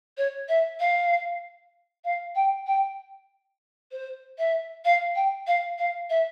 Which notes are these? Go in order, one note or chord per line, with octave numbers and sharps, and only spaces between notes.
C#5
E5
F5
F5
G5
G5
C5
E5
F5
G5
F5
F5
E5